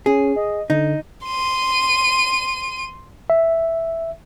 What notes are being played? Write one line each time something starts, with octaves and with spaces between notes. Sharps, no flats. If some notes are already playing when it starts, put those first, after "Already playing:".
C#4 G#4
D#5
D3 D#4
C6 D#7
E5